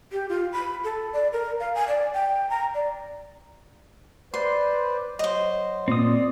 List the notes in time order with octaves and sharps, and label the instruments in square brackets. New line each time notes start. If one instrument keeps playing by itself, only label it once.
[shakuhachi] G4
F4
B5
A4
D5
A#4
F5
G#5
D5
G5
A#5
D5
[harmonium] B4 C5 D5 [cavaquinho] C6
[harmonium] F#3 [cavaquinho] C5 D#5
[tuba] A#2 [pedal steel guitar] C4 D#6 [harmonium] D5